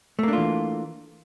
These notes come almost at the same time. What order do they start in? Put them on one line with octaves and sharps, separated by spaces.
A3 A#3 D4 F4 E3